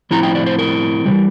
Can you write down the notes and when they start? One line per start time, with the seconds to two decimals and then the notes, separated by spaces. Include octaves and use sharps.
0.11 A2 F3 C4 E4 A#5
0.23 G5
0.35 D5
0.46 C5
0.58 A#4
1.05 C3 E3 G3